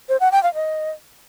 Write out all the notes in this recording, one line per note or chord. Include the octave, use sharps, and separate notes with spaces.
C5
F#5
G5
F5
D#5